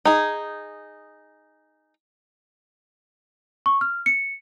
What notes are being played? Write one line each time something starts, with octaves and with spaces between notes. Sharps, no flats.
D#4 G#4
C#6
F6
C#7